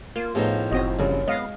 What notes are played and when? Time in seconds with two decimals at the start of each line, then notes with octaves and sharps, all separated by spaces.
0.16 A#3 F4
0.35 A2 F3 B3 D#4 G#4 A4
0.71 F#1 C4 F#4 D#5
0.98 A#1 F#2 C#3 G3
1.28 G#3 B3 D#5 F5